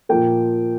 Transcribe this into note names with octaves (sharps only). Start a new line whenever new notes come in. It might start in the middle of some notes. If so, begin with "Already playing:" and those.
A#2 F3 A#3 G5